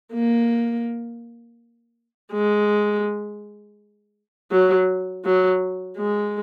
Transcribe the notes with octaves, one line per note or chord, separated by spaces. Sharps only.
A#3
G#3
F#3
F#3
G#3